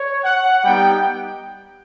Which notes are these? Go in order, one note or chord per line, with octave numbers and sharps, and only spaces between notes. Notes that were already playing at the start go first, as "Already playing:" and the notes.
Already playing: C#5
F#5
G3 B3 D#4 G4 G5